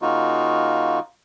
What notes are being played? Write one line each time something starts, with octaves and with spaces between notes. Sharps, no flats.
C#3 A#3 D#4 F4 F#4